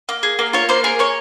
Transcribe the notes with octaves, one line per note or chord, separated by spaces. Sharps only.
A#3
G#4
A#3
F4 C#5
A#3 C5
G#4 A#4
A#3 C#5